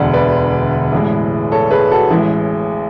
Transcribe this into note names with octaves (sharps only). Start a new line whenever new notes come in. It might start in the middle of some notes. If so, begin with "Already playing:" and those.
Already playing: E1 D2 D3 D5 F#5
B4 D5
A1 A2 G#3
A4 C#5
G#4 B4
F#4 A4
A1 A2 E3 G#3 E4